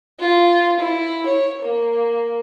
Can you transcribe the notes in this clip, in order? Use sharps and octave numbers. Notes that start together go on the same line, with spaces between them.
F4
E4
C#5
A#3